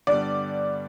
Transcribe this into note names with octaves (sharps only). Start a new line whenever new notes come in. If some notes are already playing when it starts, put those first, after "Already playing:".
G2 D3 G3 B3 D5